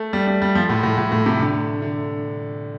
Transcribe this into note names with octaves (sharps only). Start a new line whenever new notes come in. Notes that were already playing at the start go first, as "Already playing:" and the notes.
Already playing: A3
G3
G3
G3
F3
A2
A2
A2
A2
C3
D3
D3